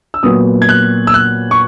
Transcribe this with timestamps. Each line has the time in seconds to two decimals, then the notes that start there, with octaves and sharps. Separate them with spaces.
0.14 E6
0.23 A#2 F#3 B3 D#6
0.62 G#6
0.69 F#6
1.07 E6
1.14 F#6
1.51 C#6